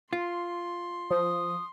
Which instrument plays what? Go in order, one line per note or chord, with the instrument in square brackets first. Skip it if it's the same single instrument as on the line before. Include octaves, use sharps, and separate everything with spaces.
[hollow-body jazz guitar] F4 [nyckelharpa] C6
[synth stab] F3 [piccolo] D#6